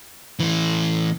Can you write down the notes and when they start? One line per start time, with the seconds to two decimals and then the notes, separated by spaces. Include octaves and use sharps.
0.40 A2 E3